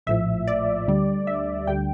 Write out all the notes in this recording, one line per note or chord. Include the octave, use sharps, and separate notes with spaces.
A#1 A2 F3 E5
D5
D2 D3 G3
E5
D2 D3 G3 G5